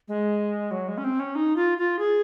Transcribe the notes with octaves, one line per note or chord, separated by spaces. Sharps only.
G#3
F#3
G#3
C#4
C4
C#4
D#4
F4
F4
G#4